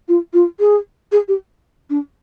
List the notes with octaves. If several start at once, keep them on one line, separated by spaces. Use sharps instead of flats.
F4
F4
G#4
G#4
G4
D4